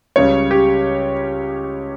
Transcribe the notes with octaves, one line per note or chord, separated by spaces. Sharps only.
C#2 C#3 G3 C#5
G4